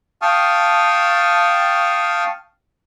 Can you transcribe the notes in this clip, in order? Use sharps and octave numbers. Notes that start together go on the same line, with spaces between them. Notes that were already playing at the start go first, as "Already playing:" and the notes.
F5 G5 A5 C#6 D#6 F6